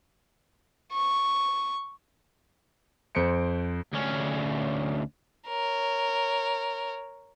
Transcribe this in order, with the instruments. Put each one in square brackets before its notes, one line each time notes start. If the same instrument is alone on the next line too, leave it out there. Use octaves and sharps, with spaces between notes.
[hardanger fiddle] C#6
[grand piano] F2 C5 C#7 D7
[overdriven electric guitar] D2 C#4
[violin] A#4 C#5